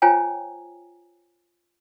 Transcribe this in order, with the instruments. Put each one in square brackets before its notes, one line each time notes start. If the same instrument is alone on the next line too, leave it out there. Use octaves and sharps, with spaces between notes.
[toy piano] F4 C5 C#5 G5 G#5 A#5